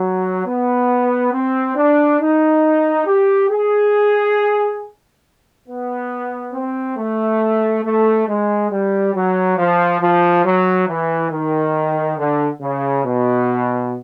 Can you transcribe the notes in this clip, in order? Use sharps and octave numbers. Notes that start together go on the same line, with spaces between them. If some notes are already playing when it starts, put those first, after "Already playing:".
Already playing: F#3
B3
C4
D4
D#4
G4
G#4
B3
C4
A3
A3
G#3
G3
F#3
F3
F3
F#3
E3
D#3
D3
C#3
B2